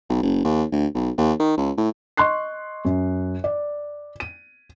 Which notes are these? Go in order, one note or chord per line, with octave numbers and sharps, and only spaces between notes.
B1
F#1
D#2
D2
B1
D#2
D#3
C#2
A2
D#5 C6 C#6 F#6 C7
F#2
D5
D#7